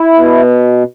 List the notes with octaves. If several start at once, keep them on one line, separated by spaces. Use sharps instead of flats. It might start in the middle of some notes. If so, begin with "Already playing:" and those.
Already playing: E4
B2